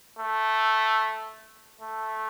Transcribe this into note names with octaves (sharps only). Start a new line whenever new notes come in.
A3
A3